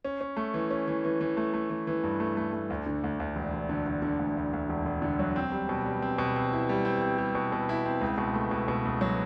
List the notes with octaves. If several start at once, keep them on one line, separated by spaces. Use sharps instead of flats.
C#4
C#4
A3
E3
C#4
E3
E3
E3
A3
A3
E3
E3
G2
A3
A3
A3
D2
D3
D2
D2
E1
E1
D3
D3
D3
D2
D2
D2
E1
E1
D3
F#3
C4
G3
B2
G3
C4
B2
C4
E4
G3
C4
C4
G3
B2
B2
E4
C4
C#2
B2
A3
B2
B2
C#2
F#3